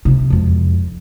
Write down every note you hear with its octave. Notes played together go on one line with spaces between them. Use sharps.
C3
E1 F2